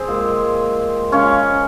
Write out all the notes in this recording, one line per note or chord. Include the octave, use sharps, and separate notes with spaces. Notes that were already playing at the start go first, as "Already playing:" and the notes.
Already playing: C4 G#4
A#2 G#3
C#3 F3 G#3 C#4